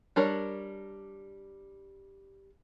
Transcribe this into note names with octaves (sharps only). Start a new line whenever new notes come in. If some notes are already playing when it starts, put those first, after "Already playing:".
G3 D4 A#4 C#5